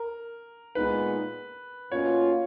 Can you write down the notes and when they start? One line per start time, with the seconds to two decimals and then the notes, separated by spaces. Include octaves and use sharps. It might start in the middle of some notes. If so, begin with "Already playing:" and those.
Already playing: A#4
0.75 A#2 G#3 B3 D#4 B4
1.91 B2 A#3 C#4 F4 C#5